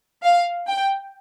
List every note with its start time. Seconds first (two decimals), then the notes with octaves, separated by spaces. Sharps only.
0.24 F5
0.67 G5